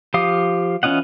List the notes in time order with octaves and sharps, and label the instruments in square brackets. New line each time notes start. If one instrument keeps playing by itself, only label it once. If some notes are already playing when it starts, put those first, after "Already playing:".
[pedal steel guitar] F3 G4 F5 D#6
E3 C#4 F4 D#5 F#5